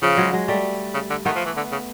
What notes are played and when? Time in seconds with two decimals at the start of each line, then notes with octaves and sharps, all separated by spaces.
0.02 C#3 F3
0.17 F#3 G#3
0.33 F#3 G#3
0.48 G3 A3
0.94 C#3
1.10 D3
1.25 D#3 A3 B3
1.36 F3
1.46 E3
1.56 D3
1.72 C#3